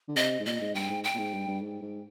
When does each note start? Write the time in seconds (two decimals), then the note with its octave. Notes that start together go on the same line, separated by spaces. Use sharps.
0.08 D3
0.16 C3 D#5
0.39 G#2
0.46 A#2 D#5
0.61 G#2
0.75 G2 G5
0.90 G#2
1.04 G5
1.14 A#2
1.18 G#2
1.34 G2
1.47 G2
1.62 G#2
1.82 G#2